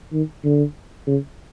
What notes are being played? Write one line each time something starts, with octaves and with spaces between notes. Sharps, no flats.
D#3
D3
C#3